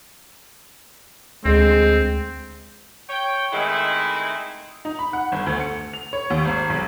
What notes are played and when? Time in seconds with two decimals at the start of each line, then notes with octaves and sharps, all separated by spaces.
1.45 D2 G#3 C4
3.09 C#5 G5
3.52 D#3 G#3 A3 C4 E4
4.85 D#4
4.99 B5
5.13 F#5
5.32 G1
5.46 D2
5.60 C#7
5.93 F7
6.13 C#5
6.30 D#2
6.45 G#1
6.70 B1